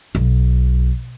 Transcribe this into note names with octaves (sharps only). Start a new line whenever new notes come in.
B1